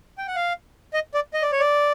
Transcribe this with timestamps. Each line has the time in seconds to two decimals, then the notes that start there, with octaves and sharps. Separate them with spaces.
0.18 G5
0.27 F#5
0.35 F5
0.94 D#5
1.14 D5
1.34 D#5
1.42 D5
1.52 C#5
1.60 D5